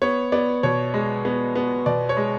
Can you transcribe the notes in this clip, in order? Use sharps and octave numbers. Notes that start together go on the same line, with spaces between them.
B3 C#5
B3 D5
B2 C#5
G#3
B3
B3
B2 D5
C#5
G#3